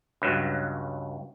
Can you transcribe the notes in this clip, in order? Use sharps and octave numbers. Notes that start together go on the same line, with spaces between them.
C#2 G2 F#3